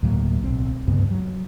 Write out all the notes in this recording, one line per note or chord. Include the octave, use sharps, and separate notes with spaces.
D2 A2 F#3 A#3
D1 B1 C4
D2 G2 C#3 B3
F#3